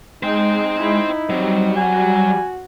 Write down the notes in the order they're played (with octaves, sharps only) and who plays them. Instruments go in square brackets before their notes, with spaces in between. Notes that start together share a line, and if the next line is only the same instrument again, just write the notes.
[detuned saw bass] G#3 [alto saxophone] D#4 [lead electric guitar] C5 G5
[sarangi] E4
[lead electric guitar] F#3 [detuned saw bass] G3 [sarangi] C4
[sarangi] F#4 [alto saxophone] G#5